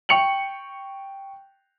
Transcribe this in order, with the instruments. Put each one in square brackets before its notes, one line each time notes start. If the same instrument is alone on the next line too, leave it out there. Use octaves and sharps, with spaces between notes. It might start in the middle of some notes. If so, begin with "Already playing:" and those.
[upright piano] G5 C#6 C#7 F7 F#7